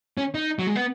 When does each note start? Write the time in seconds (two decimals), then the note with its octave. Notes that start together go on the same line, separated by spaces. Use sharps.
0.18 C#4
0.34 D#4
0.59 F#3
0.67 G#3
0.75 B3